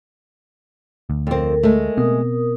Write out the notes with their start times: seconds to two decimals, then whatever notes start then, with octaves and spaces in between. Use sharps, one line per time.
1.10 D2
1.27 F2 C4 A4 A#4
1.63 G#3 A3
1.98 B2 B3 C4 A#4 D#6